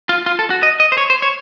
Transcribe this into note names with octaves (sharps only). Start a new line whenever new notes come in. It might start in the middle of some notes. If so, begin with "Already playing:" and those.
F4
F4
A4
F#4
D#5
D#5
C5
C#5
C5
C#5